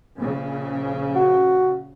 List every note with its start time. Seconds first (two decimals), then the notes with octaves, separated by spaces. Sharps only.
0.18 A#1 C#3
1.15 F#4